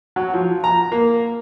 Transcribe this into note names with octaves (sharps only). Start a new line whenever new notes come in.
F#3
F3
A#5
A#3